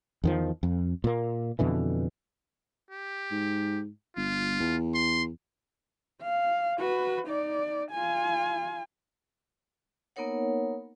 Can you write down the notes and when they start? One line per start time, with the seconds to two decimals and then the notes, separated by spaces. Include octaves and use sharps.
0.24 E2 D#3 F3
0.63 F2
1.04 A#2 A#3
1.59 F2 B2 D3 E3
2.91 G4
3.31 G#2
4.17 G1 F4
4.60 E2
4.94 C6
6.22 F5
6.79 F#4 B4
7.27 D#4 D5
7.91 F4 G#5
10.16 A#3 B3 D#4 A#4 C#5 F#5